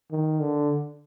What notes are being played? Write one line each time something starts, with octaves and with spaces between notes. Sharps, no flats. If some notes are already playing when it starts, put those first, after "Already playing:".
D#3
D3